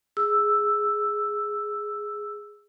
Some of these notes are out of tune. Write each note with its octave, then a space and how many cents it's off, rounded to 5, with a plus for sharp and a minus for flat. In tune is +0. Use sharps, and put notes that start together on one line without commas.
G#4 +0 E6 +0